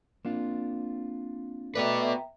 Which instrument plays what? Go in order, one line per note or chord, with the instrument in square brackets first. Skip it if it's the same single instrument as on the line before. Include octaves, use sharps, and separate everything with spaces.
[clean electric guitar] A#3 D4 F4 [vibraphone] C4
[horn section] A3 D5 [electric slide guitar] B3 F#4 B4 [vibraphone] E5 G5 A#5